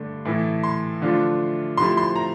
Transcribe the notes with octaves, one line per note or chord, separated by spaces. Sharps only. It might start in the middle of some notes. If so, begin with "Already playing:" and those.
Already playing: G2 D3 A3 D4
A2 E3 A3 E4
C6
D3 F3 A3 D4 F4
C3 F3 A3 C4 E4 C6
C6
A#5